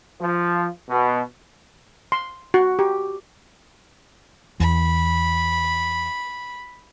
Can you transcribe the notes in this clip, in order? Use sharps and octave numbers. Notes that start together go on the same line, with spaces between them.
F3
B2
C6
F#4
G4
E2 B5